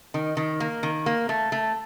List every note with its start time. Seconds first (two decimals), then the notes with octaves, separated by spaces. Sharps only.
0.14 D#3
0.37 D#3
0.60 A#3
0.83 D#3
1.06 A#3
1.29 A3
1.52 A3